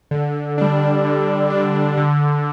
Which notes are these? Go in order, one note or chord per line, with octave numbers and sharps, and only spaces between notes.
D3
G3 D4
D3
G3 D4
D3